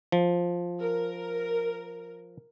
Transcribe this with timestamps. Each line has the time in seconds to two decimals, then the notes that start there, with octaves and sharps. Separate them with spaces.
0.12 F3
0.80 A#4